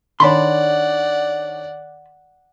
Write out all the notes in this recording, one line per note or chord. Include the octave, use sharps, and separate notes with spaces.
D#3 D4 C#5 D5 F#5 A5 B5 C6